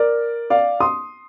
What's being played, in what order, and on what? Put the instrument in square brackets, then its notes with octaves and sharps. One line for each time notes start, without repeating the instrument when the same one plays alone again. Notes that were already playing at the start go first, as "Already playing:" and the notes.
Already playing: [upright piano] A#4 D5
D5 F5
C6 D#6